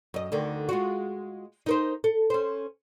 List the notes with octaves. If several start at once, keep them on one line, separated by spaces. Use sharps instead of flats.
F#2 D#5
D2 D3 D#3
G#3 F4 F#4
D#4 A#4 C5
A4
C#4 C5